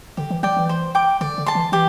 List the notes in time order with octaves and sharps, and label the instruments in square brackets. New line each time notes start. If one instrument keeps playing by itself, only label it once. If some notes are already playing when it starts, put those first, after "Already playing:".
[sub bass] D3 [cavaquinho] G4
[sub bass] E3
[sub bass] F#3 [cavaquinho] D5 G5
[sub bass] E3
[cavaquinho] C5
G5 D6
[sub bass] D3 [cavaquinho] D5
[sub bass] D3
[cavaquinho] A5 C6
[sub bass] E3
[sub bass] E3 [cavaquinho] G4